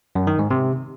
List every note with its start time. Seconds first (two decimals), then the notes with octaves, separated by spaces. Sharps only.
0.15 F#2
0.27 D#3
0.39 G#2
0.51 C3